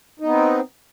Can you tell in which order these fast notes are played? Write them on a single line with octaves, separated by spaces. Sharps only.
D#4 B3 C4